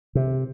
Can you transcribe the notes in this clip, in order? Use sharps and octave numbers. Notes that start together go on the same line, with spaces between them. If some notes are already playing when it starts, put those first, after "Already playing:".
C3